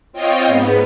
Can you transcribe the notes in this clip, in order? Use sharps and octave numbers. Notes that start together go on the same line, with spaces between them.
C4 F4 C#5 D#5 G5
G#2 B3